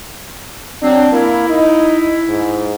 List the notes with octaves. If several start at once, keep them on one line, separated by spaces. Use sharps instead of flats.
F#3 C4 D4
A#3 E4
D#4
G#2